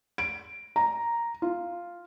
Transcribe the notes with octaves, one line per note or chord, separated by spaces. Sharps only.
D7
A#5
F4